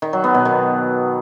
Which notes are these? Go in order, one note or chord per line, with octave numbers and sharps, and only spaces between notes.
D#3
F#3
B3
B2
D#3